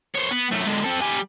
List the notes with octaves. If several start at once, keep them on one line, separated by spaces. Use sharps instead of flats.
C5 C#5
B3
F#2 A3
G#2 D3
C4 A4
G3 G#5